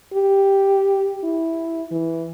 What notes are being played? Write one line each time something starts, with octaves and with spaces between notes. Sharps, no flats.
G4
E4
E3